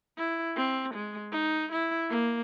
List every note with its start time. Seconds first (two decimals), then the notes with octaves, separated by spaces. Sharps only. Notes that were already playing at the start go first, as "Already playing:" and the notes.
0.18 E4
0.56 C4
0.94 G#3
1.32 D#4
1.72 E4
2.10 A#3